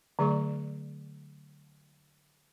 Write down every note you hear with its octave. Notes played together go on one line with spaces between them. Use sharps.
D3 F#3 A3 G#4 D5 C#6